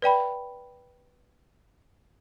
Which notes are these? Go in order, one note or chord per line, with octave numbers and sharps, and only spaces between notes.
B4 D5 G5 B5